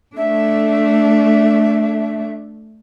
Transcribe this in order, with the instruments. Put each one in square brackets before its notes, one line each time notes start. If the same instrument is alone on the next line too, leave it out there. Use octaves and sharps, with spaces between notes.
[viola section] A3 [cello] D4 [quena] E5